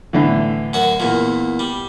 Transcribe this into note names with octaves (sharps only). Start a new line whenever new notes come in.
A2 D3 E3
F#2 F#4
E2 A#2
G3